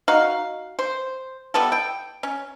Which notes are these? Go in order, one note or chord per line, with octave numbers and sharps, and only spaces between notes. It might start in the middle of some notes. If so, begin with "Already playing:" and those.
D#4 F#4 F5
C5
G3 B3 E4 A4
G5
C#4